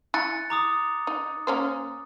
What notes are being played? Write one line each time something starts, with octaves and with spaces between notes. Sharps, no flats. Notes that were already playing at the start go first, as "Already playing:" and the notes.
E4 G#5 F#6 A6 C#7
A#5 D6 D#6
D#4
A#3 C#4 C5